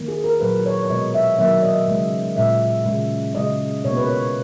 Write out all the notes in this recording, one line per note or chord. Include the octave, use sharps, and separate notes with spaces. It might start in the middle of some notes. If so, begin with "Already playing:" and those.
Already playing: D#3 A#3
G#4
A#4
A#2 F#3 A#3 B4
C#5
C#5
B2 G#3 D#5
E5
D#3 F#3 A#3 E5
D#5
C#3 G#3
A#2 G#3 E5
C#3 G#3
C#3 G#3 D#5
B2 A#3 C#5
B4
C#5